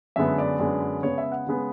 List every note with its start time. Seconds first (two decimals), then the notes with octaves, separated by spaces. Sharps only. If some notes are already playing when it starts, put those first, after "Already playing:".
0.16 F#2 D3 G#3 B3 E5
0.38 D5
0.59 F#2 D3 G#3 B3
1.03 C#3 G#3 B3 C#5
1.18 E5
1.32 F#5
1.47 C#3 G#3 B3